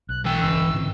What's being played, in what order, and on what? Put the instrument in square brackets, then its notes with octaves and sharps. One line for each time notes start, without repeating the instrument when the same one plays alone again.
[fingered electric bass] B1 [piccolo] F#6
[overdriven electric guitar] E3 G5 [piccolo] E6
[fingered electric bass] G1 C#3 [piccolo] E6
[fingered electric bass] G#2 D3 C4